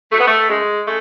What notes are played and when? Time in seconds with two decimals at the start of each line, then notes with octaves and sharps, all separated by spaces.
0.11 F#3 A3
0.19 B3
0.26 A3
0.47 F#2 G#3
0.84 C#3 A3